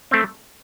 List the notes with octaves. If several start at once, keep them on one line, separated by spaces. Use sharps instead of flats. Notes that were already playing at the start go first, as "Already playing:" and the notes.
A3 C4